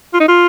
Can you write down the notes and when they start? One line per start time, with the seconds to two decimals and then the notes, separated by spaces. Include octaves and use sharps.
0.14 F4
0.20 D#4
0.28 F4